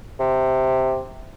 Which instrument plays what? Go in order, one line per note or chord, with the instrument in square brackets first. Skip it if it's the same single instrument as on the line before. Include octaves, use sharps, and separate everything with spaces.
[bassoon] C3